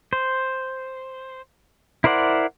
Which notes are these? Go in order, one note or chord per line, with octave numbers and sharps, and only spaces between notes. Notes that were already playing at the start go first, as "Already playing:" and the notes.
C5
E4 A#4 C5 D5 F#5